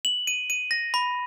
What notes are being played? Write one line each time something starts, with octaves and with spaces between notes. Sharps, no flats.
F#7
D#7
D#7
A#6
B5